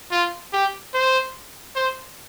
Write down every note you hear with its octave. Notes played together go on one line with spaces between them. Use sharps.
F4
G4
C5
C5